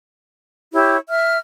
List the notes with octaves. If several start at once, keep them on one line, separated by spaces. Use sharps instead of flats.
E4 G4 C#5
E5 F6